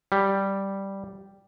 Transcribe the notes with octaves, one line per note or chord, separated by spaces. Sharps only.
G3